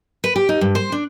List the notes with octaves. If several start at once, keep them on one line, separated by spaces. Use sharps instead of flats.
B4
G4
D#4
G2
C5
D4